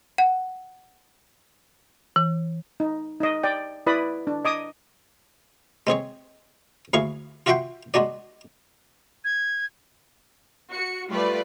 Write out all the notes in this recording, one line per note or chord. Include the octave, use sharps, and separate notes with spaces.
F#5
E3
D#4
D#4 D#5
D5 G5
E4 B4 D5 B5 D#6
D4
D#5 D6 D#6
G#3 C4 G#4 C#5
D2 E4 G#4 F5 C#6
F4 F#4 E5 F#5 G5 C6
G#3 D4 F#4 D5
G#6
F#4 C#7
G3 A3 F4 B4 D5